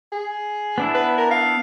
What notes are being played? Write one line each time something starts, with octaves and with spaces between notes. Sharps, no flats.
G#4
B3 D4 E4
B4
A#4
F5